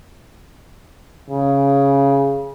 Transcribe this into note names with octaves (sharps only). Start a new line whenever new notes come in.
C#3